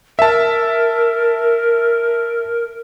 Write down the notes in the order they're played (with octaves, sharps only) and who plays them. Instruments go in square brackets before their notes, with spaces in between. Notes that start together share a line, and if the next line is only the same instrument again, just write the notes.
[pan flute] A#4 [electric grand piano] E5 A5